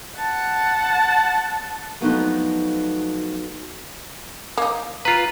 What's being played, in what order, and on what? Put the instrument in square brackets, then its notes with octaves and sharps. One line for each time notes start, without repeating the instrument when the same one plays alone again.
[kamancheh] F#5 A5
[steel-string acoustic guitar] F3 F#3 A3 B3 D4 D#4
[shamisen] A#3 D#4
[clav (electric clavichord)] F4 B4 [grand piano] A#5